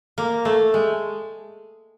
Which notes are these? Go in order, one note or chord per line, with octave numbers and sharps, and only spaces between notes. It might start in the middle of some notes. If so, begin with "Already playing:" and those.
A#3
A3
G#3